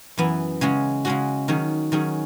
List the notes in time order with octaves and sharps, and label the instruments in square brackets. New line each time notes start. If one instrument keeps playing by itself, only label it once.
[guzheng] F#2 E3 B3 E4
C#3 G#3 C#4 F#4
C#3 G#3 C#4 F#4
D#3 F#3 C#4 G#4
D#3 F#3 C#4 G#4